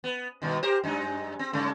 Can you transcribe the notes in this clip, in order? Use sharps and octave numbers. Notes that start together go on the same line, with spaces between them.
B3
G2 B2 D#3
G4 A#4 C5
F#2 G#3 D#4
C4
G2 C#3 A3